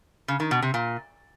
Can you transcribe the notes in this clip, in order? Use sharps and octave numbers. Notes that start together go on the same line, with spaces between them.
C#3
D#3
B2
C3
A#2